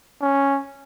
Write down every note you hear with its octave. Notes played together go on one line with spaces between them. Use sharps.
C#4